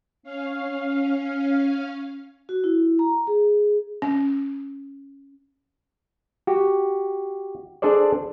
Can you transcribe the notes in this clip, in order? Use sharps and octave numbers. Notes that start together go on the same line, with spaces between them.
C#4 F5
F#4
E4
A#5
G#4
C#4
F#4 G4
D4 G#4 A4 C5 D5